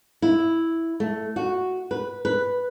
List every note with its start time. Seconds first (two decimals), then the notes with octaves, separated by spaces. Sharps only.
0.22 E4
1.00 A3
1.36 F#4
1.91 B4
2.25 B4